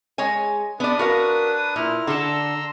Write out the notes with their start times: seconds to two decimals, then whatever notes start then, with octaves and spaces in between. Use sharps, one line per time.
0.18 G#3 C#5 G#5
0.80 B3 D4 B4 D5 D#6
0.99 F#4 A#4 F5
1.76 A#2 E4 F6
2.07 D3 A4 A#5 C6 E6